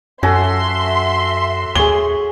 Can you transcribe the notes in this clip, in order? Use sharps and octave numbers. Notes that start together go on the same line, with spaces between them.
F#2 C#4 F#4 A4 E5 C6
D#2 G#4 C#5 G7